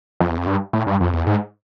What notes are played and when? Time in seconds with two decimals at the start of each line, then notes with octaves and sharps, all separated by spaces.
0.20 F2
0.30 E2
0.38 F2
0.47 G2
0.73 A2
0.87 G2
1.00 F2
1.13 E2
1.27 G#2